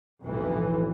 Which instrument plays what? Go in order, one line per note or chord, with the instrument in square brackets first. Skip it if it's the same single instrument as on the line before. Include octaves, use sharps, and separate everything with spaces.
[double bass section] B1 F2 A2 E3